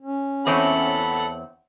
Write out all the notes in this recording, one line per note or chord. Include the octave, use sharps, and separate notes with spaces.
C#4
E2 C4 A4 C#5 F#5 B5